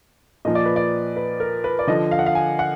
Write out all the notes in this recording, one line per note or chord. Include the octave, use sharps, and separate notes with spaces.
A#2 F3 D#5
D5
B4
D5
B4
A#4
B4
D5
D3 F3 D#5
F5
F#5
F5
G#5
F#5